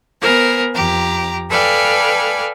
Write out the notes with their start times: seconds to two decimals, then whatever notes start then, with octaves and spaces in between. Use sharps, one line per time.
0.20 B3 A#4 C5 G#5
0.73 F2 G4 A#5
1.49 A4 B4 D5 F5 G5 G#5